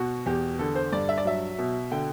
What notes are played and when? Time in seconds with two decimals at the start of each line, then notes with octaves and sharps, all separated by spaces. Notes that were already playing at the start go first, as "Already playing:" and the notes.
Already playing: B2 F#4
0.26 E2 G4
0.59 D3 A4
0.76 C5
0.92 G2 D5
1.09 E5
1.18 D5
1.25 F#3 E5
1.58 B2
1.91 D3 G5